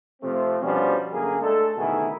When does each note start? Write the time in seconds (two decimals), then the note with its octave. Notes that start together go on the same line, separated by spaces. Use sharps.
0.22 C3 F3 A3 C4
0.62 B2 F3 G3 C#4 D4
1.12 F#2 D3 A#3 G#4
1.41 G#3 A3 D4 A4
1.77 B2 D3 D#3 A3 E4 G#4